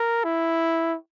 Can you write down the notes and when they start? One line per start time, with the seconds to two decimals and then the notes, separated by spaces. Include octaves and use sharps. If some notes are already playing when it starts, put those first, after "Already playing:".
Already playing: A#4
0.24 E4